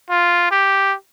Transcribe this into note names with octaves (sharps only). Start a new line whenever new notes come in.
F4
G4